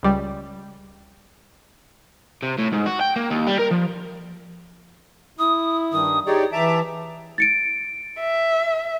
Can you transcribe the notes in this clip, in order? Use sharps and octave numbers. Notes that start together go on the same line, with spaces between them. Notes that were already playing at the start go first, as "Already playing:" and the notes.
C#2 G3
C3
A2
G#2
F#4
G5
A#3
D#2
G3
A#4
F3
E4 D#6
G2 D#3 D#6
D#4 G4 G#4 C#5 D5
E3 E5 A5 A#5 D6
A6 C#7 D7
E5